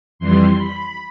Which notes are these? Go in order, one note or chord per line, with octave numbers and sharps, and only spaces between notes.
F2 E3 G3 C6
B5